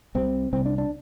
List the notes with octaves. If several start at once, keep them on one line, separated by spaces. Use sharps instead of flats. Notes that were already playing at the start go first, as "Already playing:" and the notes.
C2 C3 C4
C2 C3 C4
D4
D4